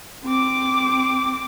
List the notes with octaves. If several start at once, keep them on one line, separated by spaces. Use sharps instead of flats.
C4 D6